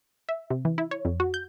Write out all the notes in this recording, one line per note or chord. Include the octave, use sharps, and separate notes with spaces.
E5
C3
E3
E4
C#5
F2
F#4
G6